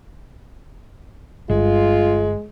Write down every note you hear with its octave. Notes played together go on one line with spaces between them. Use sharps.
G1 G#3 F4